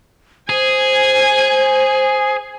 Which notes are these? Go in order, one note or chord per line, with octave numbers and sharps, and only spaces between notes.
G#4 C5 G#5